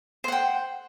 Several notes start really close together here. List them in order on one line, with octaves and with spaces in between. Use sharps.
C5 F#5 G5